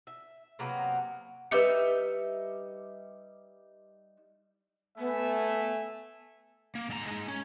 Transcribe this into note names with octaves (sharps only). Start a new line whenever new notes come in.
E5
C3 F#3 A#3 B3
G3 D#4 B4 E5 C#7
A3 B3 E5 G#5
A#3
G#2 A#5
G#3 D#4
C#4